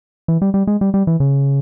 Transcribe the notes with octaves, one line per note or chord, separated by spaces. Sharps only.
E3
G3
G3
G#3
G3
G3
E3
C#3